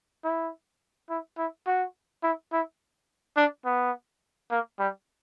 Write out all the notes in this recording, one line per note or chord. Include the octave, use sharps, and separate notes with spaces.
E4
E4
E4
F#4
E4
E4
D4
B3
A#3
G3